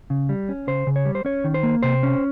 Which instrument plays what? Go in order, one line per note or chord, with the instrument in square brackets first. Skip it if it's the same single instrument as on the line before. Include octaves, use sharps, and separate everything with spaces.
[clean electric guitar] C#3
G3
C#4
C#3 C5
C#3
C#5
G3
C5
C#4 C#5
D#3
C5
A#3
C3 C5
C#4